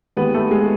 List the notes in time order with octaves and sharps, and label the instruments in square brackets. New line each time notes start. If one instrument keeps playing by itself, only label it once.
[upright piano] D#2 D#3 G#3 B3 B4
A3 A4
G#3 G#4